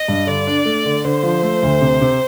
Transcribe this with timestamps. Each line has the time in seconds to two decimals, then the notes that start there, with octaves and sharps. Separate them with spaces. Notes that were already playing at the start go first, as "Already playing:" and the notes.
Already playing: D#5
0.08 G2
0.27 D3 D5
0.47 D4
0.66 A3
0.85 D3
1.04 D3 C5
1.23 F3
1.43 A3
1.63 D2
1.81 C3
2.01 C3